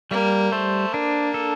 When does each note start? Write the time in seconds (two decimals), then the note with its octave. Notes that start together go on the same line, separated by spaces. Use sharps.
0.11 G3 A#3
0.52 A3 C5
0.93 A#3 D4
1.34 A4